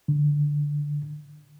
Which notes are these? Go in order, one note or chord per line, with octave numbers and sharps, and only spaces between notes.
D3